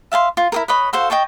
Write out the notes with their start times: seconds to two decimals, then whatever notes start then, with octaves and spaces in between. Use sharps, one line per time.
0.12 E5 F5 G#5 C6
0.37 F4
0.52 E4 G#4 A#4
0.68 B4 C#5 D#5 B5
0.93 F#4 A4 C5 F5
1.10 D#5 G5 A5 C#6